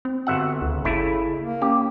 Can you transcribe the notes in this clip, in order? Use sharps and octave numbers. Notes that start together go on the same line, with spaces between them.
C4
G1 F#4 E5 F#5
D2 C#3
G1 A3 E4
A#3
C#4 G4